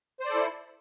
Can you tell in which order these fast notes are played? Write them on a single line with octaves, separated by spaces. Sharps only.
C5 D5 A4 E4